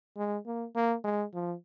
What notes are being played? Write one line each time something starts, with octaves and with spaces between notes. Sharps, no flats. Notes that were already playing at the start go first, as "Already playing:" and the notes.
G#3
A#3
A#3
G#3
F3